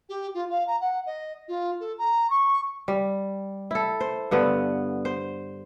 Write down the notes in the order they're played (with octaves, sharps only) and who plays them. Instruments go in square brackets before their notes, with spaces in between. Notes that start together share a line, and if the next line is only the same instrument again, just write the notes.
[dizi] G4
F4
F5
A#5
F#5
D#5
F4
A4
A#5
C#6
[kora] G3
E4 A4
C5
G2 D3 B3
C5